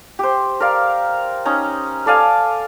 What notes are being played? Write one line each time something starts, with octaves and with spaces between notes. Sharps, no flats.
G4 C5
A#4 D5 F5
C#4 D#4 A#5
A4 D5 F5 G#5